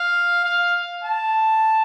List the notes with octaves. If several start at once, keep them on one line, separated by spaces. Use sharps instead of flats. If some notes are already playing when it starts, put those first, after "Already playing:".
Already playing: F5
F5
A5